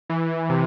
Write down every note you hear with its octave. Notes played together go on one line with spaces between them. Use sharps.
E3
C3